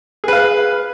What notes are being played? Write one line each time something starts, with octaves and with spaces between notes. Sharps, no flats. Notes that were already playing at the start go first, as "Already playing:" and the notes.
G#4 B4 F5